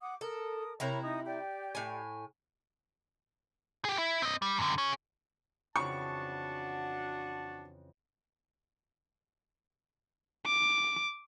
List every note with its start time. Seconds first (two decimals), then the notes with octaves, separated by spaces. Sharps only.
0.01 F#5 D6 D#6
0.21 A4 A#4 D#6
0.80 C3 E4 A#4 C#5 A#5 B5
1.02 D#4 D#5 D#6
1.24 G4 D5 G5
1.75 A2 G#5
3.85 G4 G#4
3.98 E4
4.22 C4 D#5
4.42 G3
4.59 F#2 D3
4.78 G#4 C#5
5.76 F2 C#3 E3 D4 F#4 A5 C#6
10.46 D6